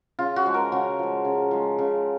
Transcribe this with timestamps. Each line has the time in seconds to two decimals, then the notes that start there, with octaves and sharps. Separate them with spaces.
0.19 C#3 F4
0.36 F#4
0.45 F3 G#3
0.54 A#4
0.72 C#3 F#4
0.99 F3 G#3
1.25 C#3
1.51 F3 G#3
1.78 C#3